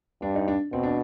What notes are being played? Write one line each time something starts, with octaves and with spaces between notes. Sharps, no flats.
G2 D4
D#4
D4
B2 C4
D4